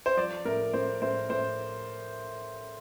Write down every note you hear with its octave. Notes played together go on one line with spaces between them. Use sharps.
C5
F3 D5
A2 A#4
A2 C5
A2 C5
A2 C5